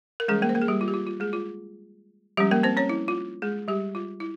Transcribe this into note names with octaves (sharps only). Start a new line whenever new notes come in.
A#4
E3 G3 G#3 C#4 G#4
A#3 A#4
C5
A#3 A#4
G#4
G3 G4
F4
G4
F4
F4
G#3 G#4
F4
F3 G3 G#3 C#4 G4
A#3 A#4
C4 C5
C#4 C#5
E4
F4
G#3 G#4
G3 G4
F4
E4